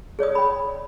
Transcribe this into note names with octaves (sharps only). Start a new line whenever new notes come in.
G#4 C#5 D5 D#6
G5 B5